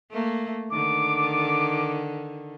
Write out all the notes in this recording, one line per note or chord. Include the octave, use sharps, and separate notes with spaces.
A3 A#3
D3 D#3 D6